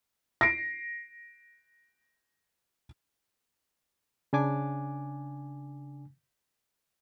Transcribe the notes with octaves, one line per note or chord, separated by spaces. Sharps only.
A#6 C7 D7
C#3 D4 G#5 D6